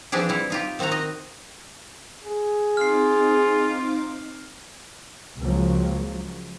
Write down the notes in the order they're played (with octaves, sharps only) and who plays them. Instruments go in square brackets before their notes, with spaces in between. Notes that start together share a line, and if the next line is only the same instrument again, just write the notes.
[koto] E3 F3 C4 D4 G4 G#4
G3 E4
D#4 F4 G4
D#3 C4 D#4 F#4 A#5
D#4 D#5
[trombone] G#4
[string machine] C4 D#4 D6 [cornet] F4 [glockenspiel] F6 C7
[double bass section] C#2 C#3 F3 F#3 G#3 A#3